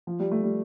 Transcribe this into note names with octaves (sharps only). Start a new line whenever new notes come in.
F3
G3
A3
G3